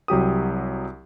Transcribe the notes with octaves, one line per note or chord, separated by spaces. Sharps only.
C2 F#3 G4 D#6